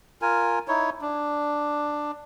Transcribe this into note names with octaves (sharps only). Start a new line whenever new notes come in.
F4 A#4 G#5
D#4 E4 C#5
D4